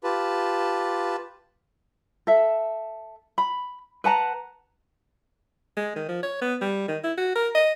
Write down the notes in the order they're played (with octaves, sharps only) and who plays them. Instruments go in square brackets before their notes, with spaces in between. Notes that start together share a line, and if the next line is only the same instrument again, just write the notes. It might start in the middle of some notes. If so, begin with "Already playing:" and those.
[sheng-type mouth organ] F4 G4 B4 A5
[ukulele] A4 E5
B5
B4 F#5 A5 A#5
[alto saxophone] G#3
D#3
F3
C#5
B3
G3
D#3
E4
F#4
A#4
D#5